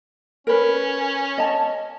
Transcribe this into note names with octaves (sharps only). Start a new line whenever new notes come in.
C#4 A#4 B4
D#5 A5